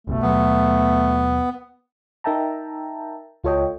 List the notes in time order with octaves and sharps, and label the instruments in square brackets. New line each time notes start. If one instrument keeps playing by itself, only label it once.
[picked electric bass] F#1 C2 B2 [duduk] A3
[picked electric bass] D#2 B2 F#3 [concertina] B3
[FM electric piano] D#4 A#4 E5 G5 A5 A#5
C#2 F4 A4 C#5 D#5 G5